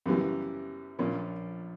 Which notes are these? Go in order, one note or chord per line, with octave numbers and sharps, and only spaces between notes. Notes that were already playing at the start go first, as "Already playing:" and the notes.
F#2 C#3 E3 G3
A#1 A#2 A#3 C#4